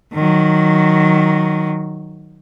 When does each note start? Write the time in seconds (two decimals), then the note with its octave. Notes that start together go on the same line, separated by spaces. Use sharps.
0.13 D#3 F#3